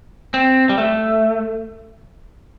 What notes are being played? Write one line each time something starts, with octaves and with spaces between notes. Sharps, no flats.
C4
G3
A3